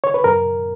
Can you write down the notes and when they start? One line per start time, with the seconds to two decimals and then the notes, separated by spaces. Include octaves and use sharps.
0.04 C#5
0.14 B4
0.24 F#2 A#4